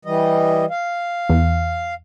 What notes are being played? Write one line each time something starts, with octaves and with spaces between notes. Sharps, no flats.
E3 G3 D#5
F5
E2